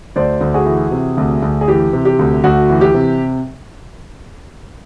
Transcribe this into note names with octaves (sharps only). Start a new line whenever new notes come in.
D2 C5 D5
D2
F#4 G#4
E3
C3
D2
D2
G#4
E3 G4
C3
G4
D2
D2 F#4
E3
G4
C3